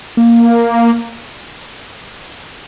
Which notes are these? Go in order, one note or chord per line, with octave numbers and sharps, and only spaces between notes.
A#3